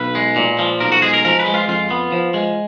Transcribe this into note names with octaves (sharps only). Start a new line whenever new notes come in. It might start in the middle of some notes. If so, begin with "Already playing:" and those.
Already playing: B1 B4
G#3
A#2
F3
B1 A#4
F#4
G#3 G#4
A#4
F3 A#4
B4
G#3
F4
F2 F4
B3
F3
G#3